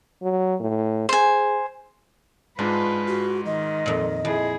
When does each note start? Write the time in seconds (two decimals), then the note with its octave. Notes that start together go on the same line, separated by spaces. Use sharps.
0.22 F#3
0.61 A2
1.09 G#4 C5 G#5
2.59 G#2 G#3 D4 F4 B4
3.08 F#4
3.46 D#3 D#5
3.86 F2 A#2
4.25 F2 E4 G#4